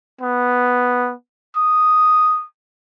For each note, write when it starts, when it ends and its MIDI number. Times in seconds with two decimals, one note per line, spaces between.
0.21 1.12 59
1.56 2.44 87